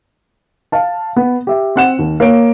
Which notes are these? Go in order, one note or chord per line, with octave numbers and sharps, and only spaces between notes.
F5 A5
B3
G4 E5
C4 F#5 E7
D#2
A#3 C#5 D7